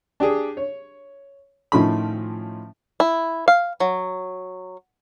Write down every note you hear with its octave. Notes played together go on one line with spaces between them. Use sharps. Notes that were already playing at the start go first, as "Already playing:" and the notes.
D4 G4 G#4
C#5
A2 D#3 F3 C#4 B5
E4
F5
F#3